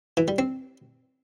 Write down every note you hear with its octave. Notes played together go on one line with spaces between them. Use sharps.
E3
G3
C4